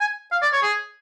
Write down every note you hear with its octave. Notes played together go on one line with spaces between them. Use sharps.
G#5
F5
D5
C#5
G#4